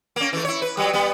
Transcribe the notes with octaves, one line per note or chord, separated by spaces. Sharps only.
A#3 C#4
E3 A3
E4 C#5
B4
F#3 G3
G3 B3